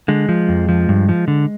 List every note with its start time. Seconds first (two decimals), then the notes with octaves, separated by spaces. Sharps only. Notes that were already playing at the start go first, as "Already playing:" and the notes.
0.08 D3 G#3
0.29 F3
0.49 F2
0.69 F3
0.88 G2
1.09 F3
1.28 D3